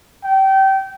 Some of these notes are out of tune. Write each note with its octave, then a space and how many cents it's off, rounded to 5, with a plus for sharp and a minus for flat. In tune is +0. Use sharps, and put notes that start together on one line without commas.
G5 -25